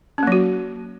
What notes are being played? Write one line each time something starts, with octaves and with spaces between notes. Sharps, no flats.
F#3 A#3 C#4 F#4